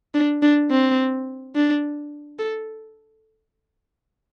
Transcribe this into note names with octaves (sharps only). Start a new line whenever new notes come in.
D4
D4
C4
D4
A4